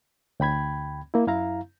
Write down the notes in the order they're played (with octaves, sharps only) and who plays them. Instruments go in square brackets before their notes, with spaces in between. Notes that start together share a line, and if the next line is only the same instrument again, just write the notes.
[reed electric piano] D2 G5 B5 G#6
A#3 E4
F#2 E4 F5 A#5